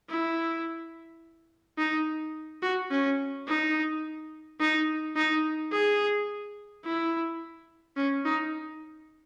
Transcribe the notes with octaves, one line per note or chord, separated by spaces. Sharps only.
E4
D#4
F#4
C#4
D#4
D#4
D#4
G#4
E4
C#4
D#4